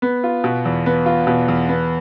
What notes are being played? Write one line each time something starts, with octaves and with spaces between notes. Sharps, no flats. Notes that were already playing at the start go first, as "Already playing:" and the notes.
B3
F4
B2
E2
B3
F4
B2
E2
B3